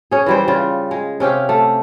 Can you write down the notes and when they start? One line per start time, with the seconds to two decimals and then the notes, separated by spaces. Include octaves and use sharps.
0.11 C#4 G#4
0.26 E3 G3 C5
0.48 C#3 G3 F4
0.91 G#3
1.20 C3 C#4 G4 F5
1.49 A3